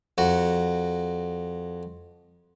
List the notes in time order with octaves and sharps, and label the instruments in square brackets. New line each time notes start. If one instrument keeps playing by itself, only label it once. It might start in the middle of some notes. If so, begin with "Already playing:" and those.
[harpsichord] F2 F#4